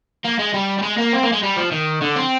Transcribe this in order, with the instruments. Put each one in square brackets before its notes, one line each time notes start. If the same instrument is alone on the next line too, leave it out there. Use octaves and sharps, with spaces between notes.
[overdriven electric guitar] A#3
G#3
G3
G3
G#3
A#3
C4
A#3
G#3
G3
F3
D#3
D3
C4